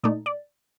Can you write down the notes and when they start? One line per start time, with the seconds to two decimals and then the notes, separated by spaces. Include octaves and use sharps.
0.03 A#2 A3 D#4 D5
0.26 D5